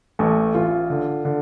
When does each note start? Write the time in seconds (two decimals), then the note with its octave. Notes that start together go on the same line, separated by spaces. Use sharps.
0.19 A1 A3
0.55 A1 F4
0.90 D3
1.25 D3